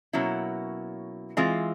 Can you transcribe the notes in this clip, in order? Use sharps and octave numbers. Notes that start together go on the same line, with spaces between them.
B2 F#3 A#3 C#4 E4
E3 G#3 C4 F4